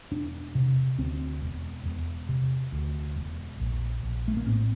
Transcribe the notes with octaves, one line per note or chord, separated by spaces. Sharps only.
E1 D4
C3
D2 C4
E1
E1
C3
D2
E1
A#1
A#1
A3
A#3
A2 C4